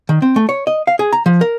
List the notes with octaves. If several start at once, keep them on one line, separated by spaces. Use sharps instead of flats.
D#3
C4
A3
C#5
D#5
F5
G#4
A#5
F3
A#4